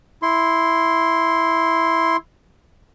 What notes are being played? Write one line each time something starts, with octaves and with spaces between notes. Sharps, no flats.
E4 C6